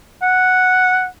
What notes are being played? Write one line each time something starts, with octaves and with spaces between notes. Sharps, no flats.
F#5